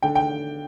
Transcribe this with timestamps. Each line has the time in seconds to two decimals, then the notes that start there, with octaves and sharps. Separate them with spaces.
0.02 D3 G5
0.15 G5